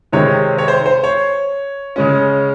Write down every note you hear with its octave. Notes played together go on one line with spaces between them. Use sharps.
C3 D#3 G#3 C4 C#5
C#5
C5
C5
C#5
C#3 G#3 C#4